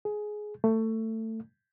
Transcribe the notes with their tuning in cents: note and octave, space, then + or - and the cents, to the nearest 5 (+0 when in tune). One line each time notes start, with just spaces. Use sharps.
G#4 +15
A3 +20